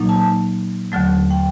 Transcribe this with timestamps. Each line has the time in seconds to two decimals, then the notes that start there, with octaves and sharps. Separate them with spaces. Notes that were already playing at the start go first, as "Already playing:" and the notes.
Already playing: A#2 F#3 A#3 D#4
0.09 A5
0.92 D#2 D3 F#3 A3
1.30 G5